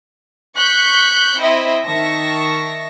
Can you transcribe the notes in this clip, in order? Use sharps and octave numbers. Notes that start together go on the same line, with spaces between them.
C#6 F#6 G6 B6 C#7
C4 E4 D#5 E5
D#3 E5 A5 C#6 A#6